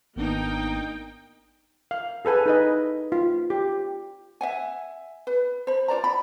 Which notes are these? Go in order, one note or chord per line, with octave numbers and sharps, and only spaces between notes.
G#1 A#3 B3 D4 D#4 G5
F5
G#4 A4 B4 G#5
D#4 B4 D#5
F4
G4
E5 F#5 G#5
B4
C5 B5
F4 C5 D5 A#5
B5